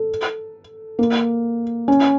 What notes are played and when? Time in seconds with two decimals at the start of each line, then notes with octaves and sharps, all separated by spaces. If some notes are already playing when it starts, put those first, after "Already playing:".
Already playing: A4
0.99 A#3
1.88 C#4